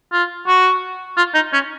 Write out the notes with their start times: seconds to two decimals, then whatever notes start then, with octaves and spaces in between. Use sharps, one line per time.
0.12 F4
0.48 F#4
1.17 F4
1.34 D#4
1.53 C#4